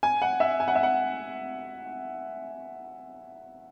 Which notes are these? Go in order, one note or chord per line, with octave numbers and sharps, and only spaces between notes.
G#5
F#5
E5
G#5
F#5
E5
F#5